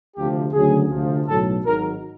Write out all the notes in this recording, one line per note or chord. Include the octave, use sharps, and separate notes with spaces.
D2 C3 F3 G4
D2 C#3 F#3 G#4
D2 C3 F3
B1 A2 F#3 A4
G#1 G#2 D#3 F#3 A#4